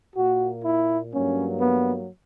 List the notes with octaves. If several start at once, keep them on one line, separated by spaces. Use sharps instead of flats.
A#2 A#3 F#4
E4
G2 F#3 A#3 C#4
B3